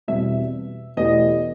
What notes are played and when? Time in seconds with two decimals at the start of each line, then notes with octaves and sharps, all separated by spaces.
0.08 E2 B2 G3 C4 E5
0.97 E2 B2 A3 E4 G4 D#5